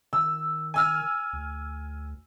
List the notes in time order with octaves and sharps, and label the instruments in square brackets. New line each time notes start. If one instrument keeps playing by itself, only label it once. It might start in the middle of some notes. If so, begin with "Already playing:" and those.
[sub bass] D#3 [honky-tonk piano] E6
[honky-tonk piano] G#5 E6 F6
[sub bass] D2